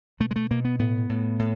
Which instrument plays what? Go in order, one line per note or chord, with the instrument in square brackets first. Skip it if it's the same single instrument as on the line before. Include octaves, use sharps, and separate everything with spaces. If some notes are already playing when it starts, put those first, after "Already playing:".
[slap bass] B2 A3
G#3
A3
B2 A#3
B3
A2 B3
A2
A2